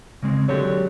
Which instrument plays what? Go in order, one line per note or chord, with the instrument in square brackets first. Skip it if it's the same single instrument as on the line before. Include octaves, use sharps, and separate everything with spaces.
[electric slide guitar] C#3 G#3 C4
[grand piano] D3 G#3 [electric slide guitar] F#3 G4 [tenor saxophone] C#5